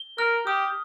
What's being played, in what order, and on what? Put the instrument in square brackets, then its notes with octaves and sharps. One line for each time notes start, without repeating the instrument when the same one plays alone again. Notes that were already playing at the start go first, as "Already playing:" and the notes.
Already playing: [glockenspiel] G7
[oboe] A#4 [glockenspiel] F6
[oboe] G4 [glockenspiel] D#6